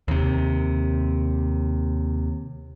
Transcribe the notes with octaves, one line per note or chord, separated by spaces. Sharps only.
D#2 C3